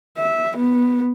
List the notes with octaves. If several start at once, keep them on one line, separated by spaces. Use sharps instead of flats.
E5
B3